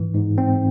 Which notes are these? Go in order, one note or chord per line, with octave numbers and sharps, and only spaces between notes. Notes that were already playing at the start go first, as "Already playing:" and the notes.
Already playing: G#2 E3
G#2
C4